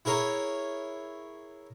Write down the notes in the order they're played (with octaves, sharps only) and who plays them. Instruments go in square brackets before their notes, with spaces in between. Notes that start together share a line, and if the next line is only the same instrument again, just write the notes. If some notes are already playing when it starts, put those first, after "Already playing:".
[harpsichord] E4 G#4 A#4 C#5